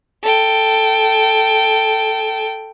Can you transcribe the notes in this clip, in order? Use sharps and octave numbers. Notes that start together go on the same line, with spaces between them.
A4 G5